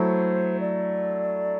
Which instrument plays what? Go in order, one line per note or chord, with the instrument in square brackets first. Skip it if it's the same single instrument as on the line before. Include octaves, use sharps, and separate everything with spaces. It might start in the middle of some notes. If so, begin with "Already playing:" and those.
Already playing: [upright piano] F#3 A3 E4 A4 [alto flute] C5
[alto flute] D5